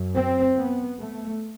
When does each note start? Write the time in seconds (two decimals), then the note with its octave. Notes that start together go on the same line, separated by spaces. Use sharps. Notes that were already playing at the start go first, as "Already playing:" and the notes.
Already playing: F#2
0.15 C4
0.56 B3
0.98 A3